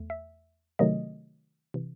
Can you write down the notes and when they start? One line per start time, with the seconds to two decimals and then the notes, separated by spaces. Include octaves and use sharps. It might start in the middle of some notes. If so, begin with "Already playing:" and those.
Already playing: E2 A3
0.10 E5
0.79 C3 D#3 F#3 A3 D#5
1.74 C3 E3